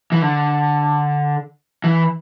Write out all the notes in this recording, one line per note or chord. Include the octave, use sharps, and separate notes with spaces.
E3
D3
E3